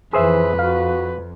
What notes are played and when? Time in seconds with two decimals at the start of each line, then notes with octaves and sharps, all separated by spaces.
0.13 F2 E3 G#4 B4 C5 E5
0.59 F#4 F5